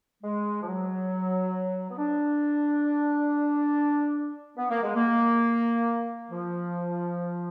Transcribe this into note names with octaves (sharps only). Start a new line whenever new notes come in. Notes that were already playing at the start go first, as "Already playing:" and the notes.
G#3
F3
F#3
B3
D4
B3
A#3
G#3
A#3
F3